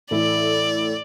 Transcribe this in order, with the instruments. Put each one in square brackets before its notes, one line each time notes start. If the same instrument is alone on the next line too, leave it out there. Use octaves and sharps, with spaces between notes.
[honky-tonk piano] A2 E3 A3 E4 [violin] D5